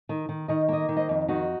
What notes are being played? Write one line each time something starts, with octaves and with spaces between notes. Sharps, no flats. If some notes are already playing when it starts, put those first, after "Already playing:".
D#3
D#3
D#3 D#5
A#3 D#5
D#3
C5 D#5
F2
D#3 D#4 F#4